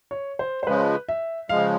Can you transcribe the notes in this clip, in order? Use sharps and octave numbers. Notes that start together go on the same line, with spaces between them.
C#5
C5
C5
C#3 F3 G#3 B4
E5
C#3 F3 G#3 F5